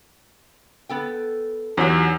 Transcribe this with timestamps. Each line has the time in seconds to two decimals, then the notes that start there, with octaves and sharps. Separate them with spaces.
0.89 B3 A4 G5
1.77 E2 F#3 D#4 G4 C#5